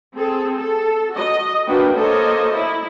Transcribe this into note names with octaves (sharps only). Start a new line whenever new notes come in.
C4 G#4 A4
A4
F#4 D#5
A#3 D4 F#4 B4 G5
A#3 A4 C5 C#5 D#5
E4